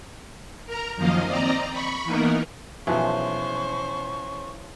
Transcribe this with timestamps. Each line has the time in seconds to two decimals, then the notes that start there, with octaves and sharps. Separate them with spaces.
0.66 A#4 A#5
0.96 F#2 D#3 F3 A#3 D#5 F5
1.26 C4 D5 D#5 A#5
1.71 B5 C#6
2.04 E3 A#3 B3 D#4 A#4
2.87 B1 E3 F3 C#4 G#4 C5 C#6